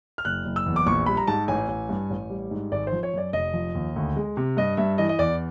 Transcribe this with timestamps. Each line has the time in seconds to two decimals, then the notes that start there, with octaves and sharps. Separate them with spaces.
0.18 F6
0.25 F#1 F#6
0.45 F#1
0.56 E6
0.66 E2
0.76 D6
0.87 A#1 C#6
1.06 G3 B5
1.17 A#5
1.27 G#2 A5
1.48 A1 G#5
1.68 A1
1.89 G2
2.10 A1
2.30 G3
2.51 G#2
2.72 G#1 D5
2.87 C5
2.93 F3
3.03 C#5
3.14 F#2 D5
3.33 F1 D#5
3.54 F3
3.75 D#2
3.96 D2
4.16 G#3
4.37 C3
4.57 G2 D#5
4.77 G2 E5
4.98 E3 D#5
5.09 D#5
5.19 E2 D5